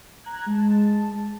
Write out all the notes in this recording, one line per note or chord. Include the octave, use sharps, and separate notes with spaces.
A#5 F#6 G#6
G#3 A5